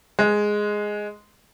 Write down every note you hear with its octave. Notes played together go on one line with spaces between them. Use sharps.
G#3